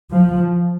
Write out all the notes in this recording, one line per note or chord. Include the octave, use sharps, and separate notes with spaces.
F3